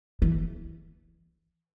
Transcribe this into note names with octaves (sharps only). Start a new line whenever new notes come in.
E3